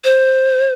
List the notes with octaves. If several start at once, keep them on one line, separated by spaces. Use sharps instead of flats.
C5